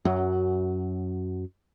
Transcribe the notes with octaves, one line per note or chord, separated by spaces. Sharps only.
F#2 F#3